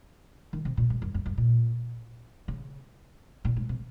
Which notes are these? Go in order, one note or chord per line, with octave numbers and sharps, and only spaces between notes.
D#3
C3
A#2
G#2
F#2
F#2
F#2
A#2
C#3
A#2
G#2
C3